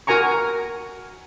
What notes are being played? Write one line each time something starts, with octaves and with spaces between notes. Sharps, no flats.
F#4 A#4 G#5 A#5 C#6